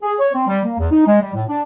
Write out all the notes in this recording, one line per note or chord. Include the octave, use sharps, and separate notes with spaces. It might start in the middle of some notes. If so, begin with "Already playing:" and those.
G#4
C#5
C4
G3
A#3
E2
D#4
G#3
G3
A2
D4